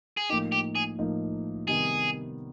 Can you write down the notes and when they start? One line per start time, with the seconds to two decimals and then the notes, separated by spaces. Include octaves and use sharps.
0.17 G#4
0.29 A2 F3 A#3 D#4 G4
0.52 G4
0.75 G#4
0.99 A2 F3 A#3 D#4
1.68 C3 D#3 G3 B3 G#4